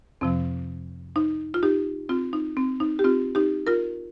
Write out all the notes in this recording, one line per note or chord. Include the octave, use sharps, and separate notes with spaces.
F2 C3 F3 C4
D#4
F4
D#4 G4
C4 F4
D#4
C4
D#4
G4
C4 F4
D#4 G4
F4 A#4